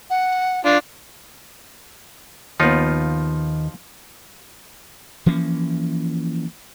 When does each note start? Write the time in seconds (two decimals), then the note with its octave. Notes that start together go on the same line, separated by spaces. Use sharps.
0.10 F#5
0.65 D4 F4
2.60 D#2 F3 B3 D#4 F4
5.26 E3 F3 A#3 C#4